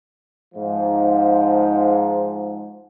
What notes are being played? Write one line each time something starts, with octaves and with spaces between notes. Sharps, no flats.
G#2 F3